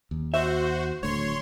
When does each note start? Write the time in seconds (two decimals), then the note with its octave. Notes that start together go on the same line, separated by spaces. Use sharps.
0.11 D#2
0.34 F#4 C5 E5
1.03 D1 D2 A3 C#5 C6